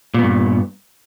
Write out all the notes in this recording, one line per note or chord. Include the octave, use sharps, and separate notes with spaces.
G2 A#2 B3